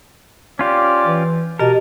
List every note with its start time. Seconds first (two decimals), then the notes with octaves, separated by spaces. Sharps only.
0.59 C#4 F4 G4 D5
1.05 E3
1.59 B2 G4 A#4 D#5 A5